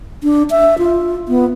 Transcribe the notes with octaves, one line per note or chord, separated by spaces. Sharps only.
D4
E5
F4
B3